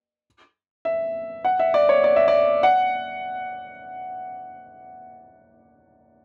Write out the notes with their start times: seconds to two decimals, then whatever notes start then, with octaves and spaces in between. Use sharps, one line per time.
0.85 E5
1.45 F#5
1.59 E5
1.74 D5
1.89 C#5
2.04 D5
2.16 E5
2.28 D5
2.63 F#5